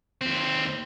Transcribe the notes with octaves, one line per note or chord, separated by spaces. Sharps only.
D#2 C4